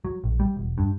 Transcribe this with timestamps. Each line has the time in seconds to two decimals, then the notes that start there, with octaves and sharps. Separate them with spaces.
0.05 F#3
0.24 A#1
0.40 G3
0.57 E1
0.78 G2